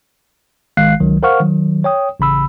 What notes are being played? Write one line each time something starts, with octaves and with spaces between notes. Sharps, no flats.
G#1 D#3 G#3 F5 F#6 C7
C#2 D#3 F#3
A#4 C5 F5 F#5 C#6 F6
D#3 F#3
C#5 G5 D#6
A1 C#3 B5 E6